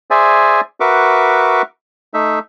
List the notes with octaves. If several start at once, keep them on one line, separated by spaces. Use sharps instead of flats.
G#4 C5 D5 E5 G#5
F#4 A#4 B4 E5 C#6 D6
A3 D#4 E5